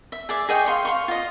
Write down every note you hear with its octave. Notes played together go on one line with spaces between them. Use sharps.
E5
G#4 D5 E5
G#4 D#5 G5 C#6
F5 C6 C#6
F5 C6 C#6
F4 D#5